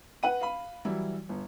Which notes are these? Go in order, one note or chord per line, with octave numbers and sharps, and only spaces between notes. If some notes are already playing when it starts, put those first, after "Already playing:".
B4 F#5 D#7
F5 B5
E3 F#3 G3 E4
G1